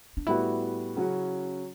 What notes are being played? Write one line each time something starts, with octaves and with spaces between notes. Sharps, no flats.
D4
A2 G3 B3 E4 F#4
C#3 F#3 C#4 F#4